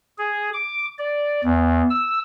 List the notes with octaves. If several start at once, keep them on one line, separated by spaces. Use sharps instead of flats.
G#4
D6
D5
E2
E6